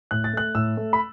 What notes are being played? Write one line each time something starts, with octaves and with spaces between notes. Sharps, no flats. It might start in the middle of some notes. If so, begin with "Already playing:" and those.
A2 F#6
A6
A3 F#6
A2 E6
A3
B5